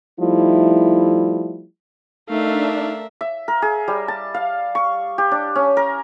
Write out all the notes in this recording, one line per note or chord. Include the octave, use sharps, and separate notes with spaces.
F3 G3 A3 D#4 E4
A3 D4 D#4 A#4 E5 F5
E5
A#4
G#4
G3
A5
F5
C#6
G4
D4
C#4
A#4